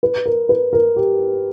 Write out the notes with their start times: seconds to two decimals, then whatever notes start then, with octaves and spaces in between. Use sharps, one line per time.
0.03 B4
0.26 A#4
0.49 B4
0.73 A#4
0.96 G4